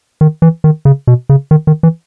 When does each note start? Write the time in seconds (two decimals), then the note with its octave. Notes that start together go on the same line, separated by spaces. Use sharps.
0.21 D#3
0.42 E3
0.64 D#3
0.85 C#3
1.07 B2
1.29 C#3
1.51 D#3
1.67 D#3
1.83 E3